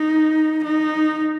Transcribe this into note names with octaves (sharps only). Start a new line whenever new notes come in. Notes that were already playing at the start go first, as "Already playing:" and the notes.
Already playing: D#4
D#4